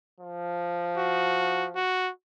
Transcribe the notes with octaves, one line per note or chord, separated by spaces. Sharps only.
F3
F#4
F#4